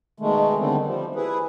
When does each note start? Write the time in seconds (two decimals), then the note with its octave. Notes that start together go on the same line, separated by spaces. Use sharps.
0.20 B2 D#3 G#3 A3
0.58 D3 D#3 G3 A3 C4
0.86 F3 G3
1.15 E4 G#4 B4